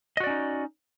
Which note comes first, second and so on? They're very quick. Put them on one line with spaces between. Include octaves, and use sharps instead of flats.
D#5 F#4 D5 C#4 D#4